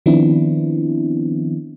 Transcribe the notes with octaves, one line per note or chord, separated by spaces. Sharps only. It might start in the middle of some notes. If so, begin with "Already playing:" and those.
D#3 F3 B3 C4 D4 E4